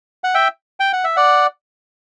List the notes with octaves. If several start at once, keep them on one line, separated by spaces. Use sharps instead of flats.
F#5
E5 G5
G5
F#5
E5
D5 F#5